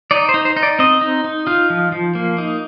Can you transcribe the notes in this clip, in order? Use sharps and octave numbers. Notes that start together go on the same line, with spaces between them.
D#4 D5
C5
D#4
C5
D#4
D5
C4 D#5
D#4
D#4
D#4 F4
F3
F3
A#3
D#4